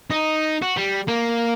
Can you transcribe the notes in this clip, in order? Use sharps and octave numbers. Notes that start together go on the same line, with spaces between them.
D#4
F#4
G3
A#3